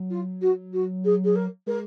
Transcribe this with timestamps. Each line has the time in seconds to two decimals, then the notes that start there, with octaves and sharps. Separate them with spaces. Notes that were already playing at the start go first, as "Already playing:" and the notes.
Already playing: F#3
0.10 F4
0.41 F#4
0.72 F#4
1.04 G#4
1.24 G#4
1.35 A#4
1.67 G#3 A#4